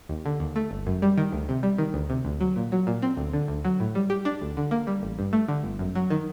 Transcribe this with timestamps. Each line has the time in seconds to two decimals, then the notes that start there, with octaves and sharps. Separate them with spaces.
0.09 D#2
0.26 D3
0.40 D#2
0.56 A3
0.71 G1
0.87 F#2
1.02 G3
1.18 D#3
1.32 D2
1.49 C3
1.63 G3
1.78 D#3
1.94 D2
2.10 C3
2.25 D2
2.41 F#3
2.56 A#2
2.72 F#3
2.87 A#2
3.02 C4
3.17 D2
3.33 D3
3.48 D2
3.65 F#3
3.80 A2
3.95 G3
4.10 G4
4.25 D4
4.42 D2
4.57 D3
4.71 A#3
4.87 G3
5.03 A1
5.19 G2
5.33 A3
5.48 D3
5.64 G1
5.79 F#2
5.95 F#3
6.10 D#3